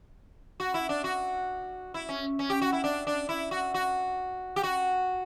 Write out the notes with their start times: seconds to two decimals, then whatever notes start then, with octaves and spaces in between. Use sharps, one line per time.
0.60 F#4
0.74 E4
0.89 D4
1.04 F#4
1.94 E4
2.09 C#4
2.39 C#4
2.50 G4
2.62 F#4
2.72 E4
2.84 D4
3.07 D4
3.29 E4
3.51 F#4
3.74 F#4
4.56 G4
4.63 F#4